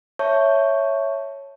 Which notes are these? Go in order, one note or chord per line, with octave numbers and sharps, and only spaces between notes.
C#5 E5 A5 C#6 G6